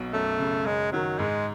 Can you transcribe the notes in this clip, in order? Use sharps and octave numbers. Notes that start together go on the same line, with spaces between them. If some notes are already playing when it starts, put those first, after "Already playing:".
Already playing: B1 B2
F#2 A3
C#3
F#2 G#3
D#3 F#3
G#2 G#3